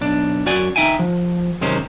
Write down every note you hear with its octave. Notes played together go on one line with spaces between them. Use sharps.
B1 D4
F#2 F#4 D5 G#5
D#4 E5 G5 G#5
F3
F#2 C3 D#3 G#3 C#4 C5